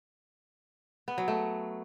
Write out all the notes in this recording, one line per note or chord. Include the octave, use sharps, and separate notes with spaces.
B3
F#3
A3